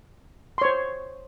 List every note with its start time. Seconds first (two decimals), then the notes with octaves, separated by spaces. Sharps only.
0.58 C6
0.62 C#5
0.65 C5